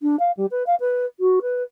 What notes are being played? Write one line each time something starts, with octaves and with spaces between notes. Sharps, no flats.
D4
F5
G3
B4
F5
B4
F#4
B4